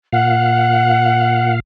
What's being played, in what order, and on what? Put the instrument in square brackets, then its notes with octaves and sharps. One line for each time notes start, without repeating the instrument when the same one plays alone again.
[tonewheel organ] A#2 F5 [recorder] F#5